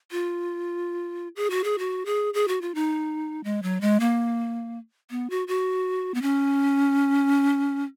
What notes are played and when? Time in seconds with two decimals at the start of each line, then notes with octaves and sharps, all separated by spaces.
0.11 F4
1.36 G#4
1.50 F#4
1.64 G#4
1.78 F#4
2.06 G#4
2.34 G#4
2.48 F#4
2.62 F4
2.75 D#4
3.44 G#3
3.63 F#3
3.81 G#3
4.00 A#3
5.10 B3
5.30 F#4
5.48 F#4
6.14 B3
6.22 C#4